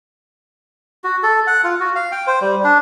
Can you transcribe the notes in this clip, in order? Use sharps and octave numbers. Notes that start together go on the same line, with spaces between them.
F#4
A4
F#5
F4
F#4
F5
G5
C5
G3
D4